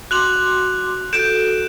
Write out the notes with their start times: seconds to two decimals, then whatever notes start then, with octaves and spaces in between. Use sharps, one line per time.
0.11 F#4 C6 D6 F#6 F7 F#7
1.13 F#4 A4 G6 D7 E7